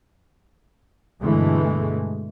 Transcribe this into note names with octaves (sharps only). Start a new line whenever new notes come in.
G2 B2 D3 E3 G#3 A3